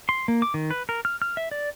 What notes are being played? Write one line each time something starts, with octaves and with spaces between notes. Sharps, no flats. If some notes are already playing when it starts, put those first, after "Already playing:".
C6
A#3
D6
D#3
B4
A#4
F6
F6
E5
D5